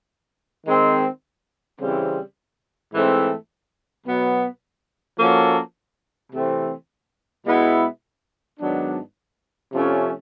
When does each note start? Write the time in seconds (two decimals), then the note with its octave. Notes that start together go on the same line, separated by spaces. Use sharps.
0.67 D#3 G#3 C4
1.80 C#3 E3 G3 C4
2.93 G#2 E3 A3 C4
4.06 B2 F#3 B3
5.20 F3 A#3 C#4 F#4 A4
6.33 C3 E3 A3 C4
7.46 B2 G#3 B3 E4
8.60 G#2 D#3 F#3 B3 D4
9.72 C3 F3 A3 C#4